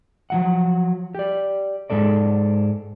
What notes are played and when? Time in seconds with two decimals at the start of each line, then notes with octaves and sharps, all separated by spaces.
0.30 F3 F#3 F#5
1.15 G4 D5
1.90 G#2 F3 G#3 A4 D5